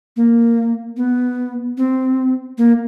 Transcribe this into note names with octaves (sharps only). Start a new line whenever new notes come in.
A#3
B3
C4
A#3